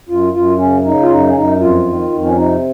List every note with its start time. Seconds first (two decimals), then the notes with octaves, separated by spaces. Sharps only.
0.07 F#2 F4
0.33 F#2 F4
0.58 C#3 C#4
0.83 C#3 D#4
1.01 F4
1.09 F#2 D#4
1.29 C#4
1.34 F#2 D#4
1.59 F2 F4
1.85 D#3
2.11 F2
2.24 C#4
2.35 C3 D#4